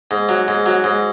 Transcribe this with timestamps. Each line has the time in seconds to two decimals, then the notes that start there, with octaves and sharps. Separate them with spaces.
0.11 G#2
0.29 F#3
0.48 G#2
0.66 F#3
0.84 G#2